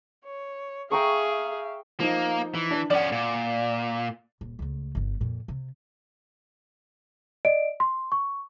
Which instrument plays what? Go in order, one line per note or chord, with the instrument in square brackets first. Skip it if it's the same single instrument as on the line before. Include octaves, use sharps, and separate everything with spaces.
[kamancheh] C#5
[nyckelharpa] G#4 [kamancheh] E5 F5 [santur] G5 A#5 C#6
[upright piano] F3 D#4 [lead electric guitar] A#3
[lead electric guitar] E3
[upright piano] D4
[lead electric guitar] F3 C#4 [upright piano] D5 F#5
[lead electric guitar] A#2
[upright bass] D#1
C#2 A3
G1 D#3
F2 A#2
C3
[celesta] D5 D#5 D7
C6
C#6